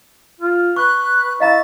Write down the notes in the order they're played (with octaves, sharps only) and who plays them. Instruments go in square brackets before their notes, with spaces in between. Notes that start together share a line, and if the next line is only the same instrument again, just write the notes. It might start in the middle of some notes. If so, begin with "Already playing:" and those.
[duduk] F4
[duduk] B4 [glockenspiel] C#6 [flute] F#6
[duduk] E4 [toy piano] D#5 F5 A#5 [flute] A6